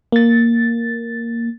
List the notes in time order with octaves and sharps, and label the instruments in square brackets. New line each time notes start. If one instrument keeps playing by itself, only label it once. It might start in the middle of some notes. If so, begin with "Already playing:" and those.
[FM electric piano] A#3 A6